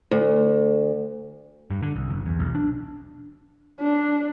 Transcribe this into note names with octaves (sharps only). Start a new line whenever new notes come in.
D2
G2
D3
C2
F#1
E2
B1
D4
D4